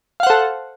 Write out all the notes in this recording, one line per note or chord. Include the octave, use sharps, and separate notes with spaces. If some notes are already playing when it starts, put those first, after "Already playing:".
A4 C5 F5 F#5